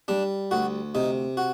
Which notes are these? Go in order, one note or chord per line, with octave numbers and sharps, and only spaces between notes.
G3 D4
D2 F#4
C3 D#4
F#4